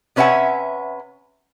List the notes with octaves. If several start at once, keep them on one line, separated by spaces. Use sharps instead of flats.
C3 C#4 B4 E5 F#5 G#5